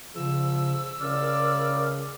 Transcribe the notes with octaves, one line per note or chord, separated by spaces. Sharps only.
C#3 F3 E6
C#3 A#4 D5